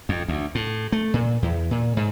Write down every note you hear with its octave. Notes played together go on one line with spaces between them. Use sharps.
F2
D2
A2
A3
A#2
E2
A#2
G#2